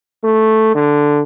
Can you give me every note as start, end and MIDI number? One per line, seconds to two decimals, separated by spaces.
0.24 0.73 57
0.75 1.23 50